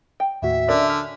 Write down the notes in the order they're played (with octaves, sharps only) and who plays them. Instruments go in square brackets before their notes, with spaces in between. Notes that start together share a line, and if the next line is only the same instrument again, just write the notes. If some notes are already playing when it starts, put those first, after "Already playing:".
[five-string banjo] G5
[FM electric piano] D#2 A2 F#4 [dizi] E5
[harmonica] D3 [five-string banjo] C#4 A#4 D5
[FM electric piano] F6 B6